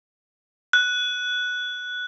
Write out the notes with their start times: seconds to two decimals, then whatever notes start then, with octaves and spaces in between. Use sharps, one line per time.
0.73 F#6